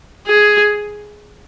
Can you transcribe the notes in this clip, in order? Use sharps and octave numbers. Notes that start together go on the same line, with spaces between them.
G#4